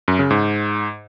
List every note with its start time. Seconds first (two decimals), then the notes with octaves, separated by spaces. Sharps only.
0.08 F#2
0.19 C#3
0.30 G#2